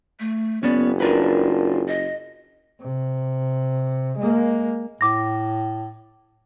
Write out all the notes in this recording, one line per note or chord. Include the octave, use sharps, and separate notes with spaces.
A3
F#1 B3 C#4 D5
D4 F4 A#4 B4
D#5
C3
G#3 A#3
A2 D6 A#6